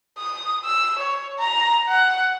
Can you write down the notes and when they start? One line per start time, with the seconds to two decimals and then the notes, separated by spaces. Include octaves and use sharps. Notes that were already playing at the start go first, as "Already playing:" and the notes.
0.17 D#6
0.65 E6
0.98 C#5
1.38 A#5
1.88 F#5